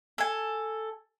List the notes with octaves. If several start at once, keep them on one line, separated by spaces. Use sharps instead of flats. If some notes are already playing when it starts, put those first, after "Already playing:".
A4 G#5